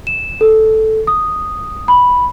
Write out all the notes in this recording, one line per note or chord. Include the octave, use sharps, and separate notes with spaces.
E7
A4
D#6
B5